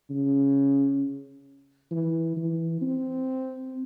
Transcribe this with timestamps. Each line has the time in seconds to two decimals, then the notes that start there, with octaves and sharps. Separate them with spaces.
0.10 C#3
1.91 E3
2.36 E3
2.81 C4